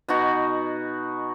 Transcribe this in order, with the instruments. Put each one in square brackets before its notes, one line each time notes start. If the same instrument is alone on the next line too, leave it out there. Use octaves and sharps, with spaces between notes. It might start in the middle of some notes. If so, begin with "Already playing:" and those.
[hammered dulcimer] B2 D#4 F#4